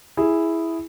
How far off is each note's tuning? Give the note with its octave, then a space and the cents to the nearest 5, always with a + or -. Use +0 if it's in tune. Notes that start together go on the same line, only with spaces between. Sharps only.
E4 +0 G#4 +0